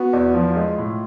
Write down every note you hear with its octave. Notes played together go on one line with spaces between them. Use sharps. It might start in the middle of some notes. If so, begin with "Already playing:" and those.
Already playing: B3 F#4
E2
F3 F4
G#3
A2